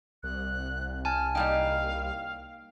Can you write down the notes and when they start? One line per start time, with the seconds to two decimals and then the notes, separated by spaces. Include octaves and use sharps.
0.23 C2 F#6
1.05 G#5 A5 F6
1.35 G3 A#3 D#4 F5 G5